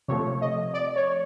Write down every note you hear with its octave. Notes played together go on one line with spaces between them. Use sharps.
C3 F3 A3 C#5
D#5
D5
C#5